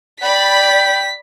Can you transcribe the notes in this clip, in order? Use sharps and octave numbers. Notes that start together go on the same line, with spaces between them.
D5 G5 B5 B6